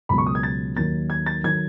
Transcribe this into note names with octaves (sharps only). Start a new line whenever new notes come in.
C#2 B2 F#3 B5
C#6
D#6
G#6
A6
D#2 D#3 F#3 A6
G#6
A6
D#3 F#3 G#6